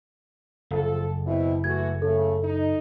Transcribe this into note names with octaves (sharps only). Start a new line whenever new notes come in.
F#1 F3 F4 A4
B2 C4 E4
E3 A3 F#4 G#6
C#3 A3 A4
D#4